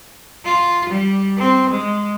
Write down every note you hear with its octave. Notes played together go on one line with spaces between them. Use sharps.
F4
G3
C4
G#3